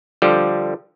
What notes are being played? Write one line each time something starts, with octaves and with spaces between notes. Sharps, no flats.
D3 F3 G3